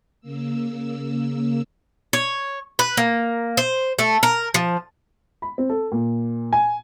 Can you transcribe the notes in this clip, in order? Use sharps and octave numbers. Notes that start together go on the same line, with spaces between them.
C#3 A#3 E6
C#5
B4
A#3
C5
A3
A#4
F3
B5
C4
A4
A#2
G#5